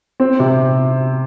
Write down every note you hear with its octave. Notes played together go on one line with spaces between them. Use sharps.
C4
C3